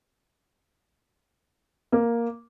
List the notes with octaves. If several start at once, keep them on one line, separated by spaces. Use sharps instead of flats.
A#3